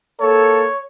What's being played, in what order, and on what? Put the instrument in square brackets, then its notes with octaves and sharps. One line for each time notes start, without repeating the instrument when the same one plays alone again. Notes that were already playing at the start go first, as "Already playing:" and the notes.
[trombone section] A#3 A4 [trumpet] C#5